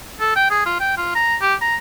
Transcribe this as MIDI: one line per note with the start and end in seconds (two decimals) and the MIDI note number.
0.20 0.36 69
0.36 0.47 79
0.51 0.63 68
0.66 0.76 65
0.80 0.98 79
0.98 1.13 65
1.15 1.36 82
1.41 1.54 67
1.62 1.76 82